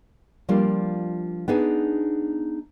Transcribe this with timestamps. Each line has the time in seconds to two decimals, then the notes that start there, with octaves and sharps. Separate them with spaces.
0.49 F3 G3 A#3 D4 F4
1.48 B3 D4 D#4 G#4